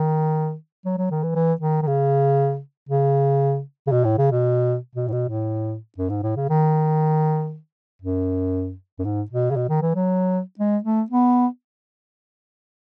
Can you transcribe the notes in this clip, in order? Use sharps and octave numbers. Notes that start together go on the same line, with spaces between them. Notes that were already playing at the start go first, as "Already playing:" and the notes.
Already playing: D#3
F#3
F#3
D#3
E3
E3
D#3
D#3
C#3
C#3
C#3
B2
A2
C#3
B2
B2
A2
B2
A2
F#2
G#2
A2
C#3
D#3
F#2
F#2
G#2
B2
C#3
B2
D#3
E3
F#3
G#3
A3
B3